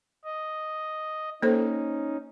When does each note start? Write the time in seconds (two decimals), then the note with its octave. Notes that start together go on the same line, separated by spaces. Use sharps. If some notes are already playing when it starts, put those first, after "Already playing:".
0.24 D#5
1.43 A#3 C#4 D#4 A4 C5